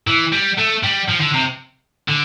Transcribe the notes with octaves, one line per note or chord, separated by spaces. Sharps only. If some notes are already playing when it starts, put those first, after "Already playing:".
E3
G3
A3
G3
F3
D3
C3
D3